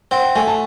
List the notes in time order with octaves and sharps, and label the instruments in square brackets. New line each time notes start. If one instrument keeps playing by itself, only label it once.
[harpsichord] C4 [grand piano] F#5
[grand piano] G5
[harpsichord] A3 [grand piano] G#5
[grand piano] A5